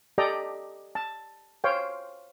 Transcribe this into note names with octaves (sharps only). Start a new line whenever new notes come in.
G4 A4 D5 D#5 G5 A#5
A5
C5 C#5 F5 G5